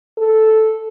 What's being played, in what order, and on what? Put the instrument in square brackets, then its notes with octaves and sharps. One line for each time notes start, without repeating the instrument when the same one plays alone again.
[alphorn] A4